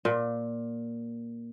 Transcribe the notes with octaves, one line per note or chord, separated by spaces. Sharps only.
A#2